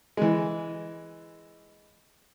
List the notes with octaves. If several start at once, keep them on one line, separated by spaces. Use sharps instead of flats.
E3 G#3